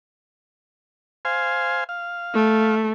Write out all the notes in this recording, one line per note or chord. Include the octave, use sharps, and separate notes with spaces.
C5 F5 G#5
F5
A3